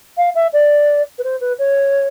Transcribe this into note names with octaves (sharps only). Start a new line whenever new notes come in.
F5
E5
D5
B4
C5
B4
C#5